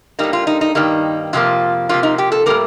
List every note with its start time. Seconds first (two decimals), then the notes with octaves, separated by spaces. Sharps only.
0.19 A2 G3 A#3 D#4
0.33 F4
0.47 D#4
0.61 D#4
0.75 G2 D#3 G3 A#3 D#4
1.33 F2 C3 F3 A#3 F4
1.89 C3 F3 A#3 F4
2.03 D#4
2.18 G4
2.32 A4
2.46 A2 G3 A#3 A#4